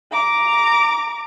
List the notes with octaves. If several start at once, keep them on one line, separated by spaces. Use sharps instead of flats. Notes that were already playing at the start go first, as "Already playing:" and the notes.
A#5 D6